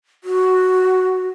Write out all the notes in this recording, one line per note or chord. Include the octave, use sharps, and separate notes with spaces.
F#4